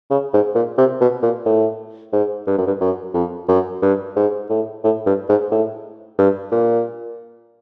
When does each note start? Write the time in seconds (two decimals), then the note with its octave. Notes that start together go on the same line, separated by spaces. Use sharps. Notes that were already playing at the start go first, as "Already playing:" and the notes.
0.10 C#3
0.33 G#2
0.55 A#2
0.78 C3
1.01 B2
1.23 A#2
1.45 A2
2.13 G#2
2.47 G2
2.58 F#2
2.67 G2
2.81 F#2
3.14 F2
3.49 F#2
3.82 G2
4.16 G#2
4.50 A2
4.84 A2
5.06 G2
5.29 G#2
5.51 A2
6.18 G2
6.52 A#2